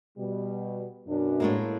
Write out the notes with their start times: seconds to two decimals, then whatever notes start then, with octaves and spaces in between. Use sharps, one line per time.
0.18 B2 G3
1.08 F#2 B2 D4
1.40 A2 G#3 A#3